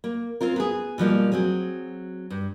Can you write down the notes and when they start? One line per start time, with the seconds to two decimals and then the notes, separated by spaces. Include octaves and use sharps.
0.04 A#3
0.41 C4 C#4 F4 A#4
0.56 B3 G#4
0.98 B2 F3 G3 A#3
1.32 F#3 C4 F#4 G#4
2.30 G2